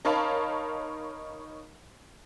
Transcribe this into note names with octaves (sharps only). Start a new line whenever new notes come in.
D#4 A#4 C#5 F5 A5 B5